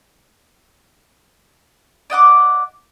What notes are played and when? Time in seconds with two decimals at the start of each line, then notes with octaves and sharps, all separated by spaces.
2.10 D5 D#5 F#5 D6